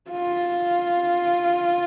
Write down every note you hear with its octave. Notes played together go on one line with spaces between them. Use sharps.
F4